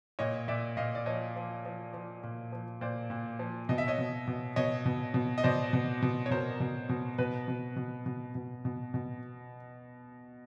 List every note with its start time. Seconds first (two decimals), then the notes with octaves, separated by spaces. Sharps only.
0.19 A#2 C#5 D#5
0.48 A#2 D5 E5
0.77 A#2 D#5 F5
0.95 D5
1.06 F3 C#5 D#5
1.36 F3
1.65 F3
1.93 F3
2.23 A#2
2.52 F3
2.81 A#2 C5 D5
3.10 A#2
3.39 F3
3.69 B2 D#5
3.78 E5
3.87 C#5 D#5
3.98 B2
4.27 B2
4.56 B2 C#5 D#5
4.86 B2
5.14 B2
5.38 D#5
5.44 B2 C5 D5
5.73 B2
6.02 B2
6.26 C#5
6.31 B2 A#4 C5
6.60 B2
6.89 B2
7.18 B2 B4
7.48 B2
7.76 B2
8.06 B2
8.35 B2
8.65 B2
8.94 B2